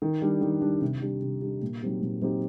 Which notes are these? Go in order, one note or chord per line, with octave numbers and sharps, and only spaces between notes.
D#3
G3 D4
D#3
G3 D4
C3
G3 D4 G4
C3
G3 D4 G4
A#2
F#3 C4 D#4 G4
A#2
F#3 C4 D#4 G4